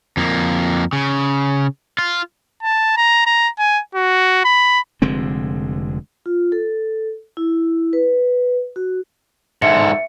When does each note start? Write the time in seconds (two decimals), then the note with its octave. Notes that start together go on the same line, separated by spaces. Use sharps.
0.17 F2 A#3
0.93 C#3
1.99 F4
2.63 A5
2.97 A#5
3.27 A#5
3.59 G#5
3.95 F#4
4.45 B5
5.02 F1 D3 G#3 C4
6.26 F4
6.52 A4
7.37 E4
7.93 B4
8.76 F#4
9.62 G#2 D3 E5 C#7